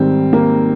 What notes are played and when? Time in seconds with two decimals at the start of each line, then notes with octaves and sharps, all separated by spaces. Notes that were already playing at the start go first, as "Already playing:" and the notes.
Already playing: G#2 D#3 G3 C4
0.33 A#3